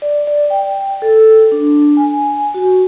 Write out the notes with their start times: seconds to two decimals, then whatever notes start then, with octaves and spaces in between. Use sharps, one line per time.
0.02 D5
0.27 D5
0.50 G5
1.02 A4
1.52 D4
1.97 G#5
2.54 F#4